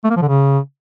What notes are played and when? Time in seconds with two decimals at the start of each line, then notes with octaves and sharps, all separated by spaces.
0.04 A3
0.10 A#3
0.16 F3
0.22 D3
0.28 C#3